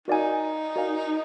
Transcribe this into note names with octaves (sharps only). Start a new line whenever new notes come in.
D#4 F#4 A#4 D5 F5 G#5
F#4 A#4 D5 F5 G#5